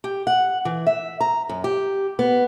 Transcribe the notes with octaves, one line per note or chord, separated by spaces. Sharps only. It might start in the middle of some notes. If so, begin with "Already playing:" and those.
G4
F#5
E3
E5
A#5
F#2
G4
B3